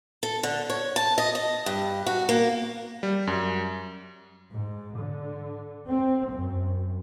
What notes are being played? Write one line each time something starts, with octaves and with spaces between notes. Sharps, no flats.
A4
D3
C#5
A5
D#5
D#5
G2
F#4
A#3
G3
F#2
G#2
D3
C4
F#2